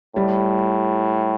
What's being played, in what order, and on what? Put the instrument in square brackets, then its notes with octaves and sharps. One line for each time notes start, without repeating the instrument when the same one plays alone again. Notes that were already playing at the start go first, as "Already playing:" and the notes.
[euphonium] A2 [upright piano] G3